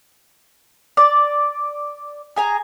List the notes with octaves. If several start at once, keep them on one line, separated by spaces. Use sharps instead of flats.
D5
G#4 G#5 A#5